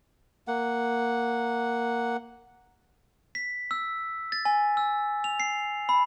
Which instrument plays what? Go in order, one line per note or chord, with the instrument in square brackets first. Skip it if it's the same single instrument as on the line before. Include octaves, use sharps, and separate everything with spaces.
[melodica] A#3 F#5
[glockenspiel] B6
E6
A6
G#5
E6
F7
C7
B5